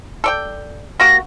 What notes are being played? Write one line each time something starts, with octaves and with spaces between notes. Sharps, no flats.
A4 D5 G5
A#3 F#4 G4 A#6